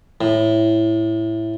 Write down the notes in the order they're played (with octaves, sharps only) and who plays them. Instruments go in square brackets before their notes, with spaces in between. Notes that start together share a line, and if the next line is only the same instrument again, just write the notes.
[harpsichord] A2